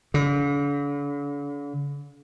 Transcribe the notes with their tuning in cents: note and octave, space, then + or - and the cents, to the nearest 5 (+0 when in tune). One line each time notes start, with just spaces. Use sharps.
D3 -45